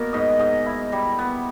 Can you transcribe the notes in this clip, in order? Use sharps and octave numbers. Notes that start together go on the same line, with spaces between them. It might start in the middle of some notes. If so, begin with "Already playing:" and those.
Already playing: B2 A#3 A#4
G#2 D#5
G#2 D#5
E4
G3
B3